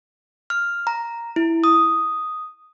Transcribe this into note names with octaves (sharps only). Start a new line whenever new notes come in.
F6
A#5
E4
D#6